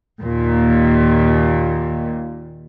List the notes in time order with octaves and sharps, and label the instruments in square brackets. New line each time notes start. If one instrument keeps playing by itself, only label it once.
[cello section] D#2 A#2